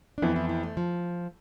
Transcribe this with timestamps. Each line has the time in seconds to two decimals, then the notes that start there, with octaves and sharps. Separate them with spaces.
0.18 D4
0.22 F2 E3 B3 E4
0.36 E4
0.49 E4
0.63 A3
0.77 F3